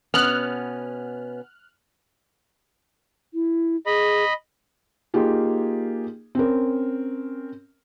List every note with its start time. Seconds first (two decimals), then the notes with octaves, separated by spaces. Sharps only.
0.14 B2 B3 C#4 F6 F#6
3.34 E4
3.86 G#4 D#5 B5
5.14 A#3 D#4 F4 G4 G#4
6.35 C4 C#4 A#4